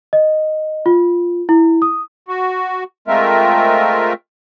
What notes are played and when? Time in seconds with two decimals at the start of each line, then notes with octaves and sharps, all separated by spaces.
0.13 D#5
0.86 F4
1.49 E4
1.82 D#6
2.28 F#4
3.08 G#3 A3 C4 F4 A#4 E5